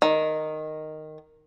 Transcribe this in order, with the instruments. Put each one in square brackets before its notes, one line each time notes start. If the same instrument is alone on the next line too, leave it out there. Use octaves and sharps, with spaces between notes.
[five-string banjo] D#3